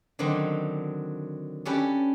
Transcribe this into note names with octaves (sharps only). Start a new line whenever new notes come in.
D3 D#3 F#3 C4
C#4 D4 G4 A4 B4 A5